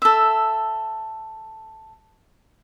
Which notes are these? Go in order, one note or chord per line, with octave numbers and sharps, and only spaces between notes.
A4 E5